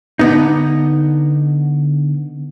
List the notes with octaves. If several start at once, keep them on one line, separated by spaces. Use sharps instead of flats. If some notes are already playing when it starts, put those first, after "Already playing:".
D3 B3 D#4